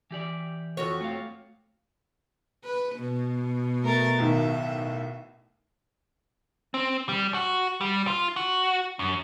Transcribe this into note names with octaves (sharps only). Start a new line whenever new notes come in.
E3 G4 D5
F2 F#4 C#5
A3 F4 F5
B4
B2
A3 A#4 A6
B1 A2 D#3 E5
C4
G3
F#4
G3
F4
F#4
F#2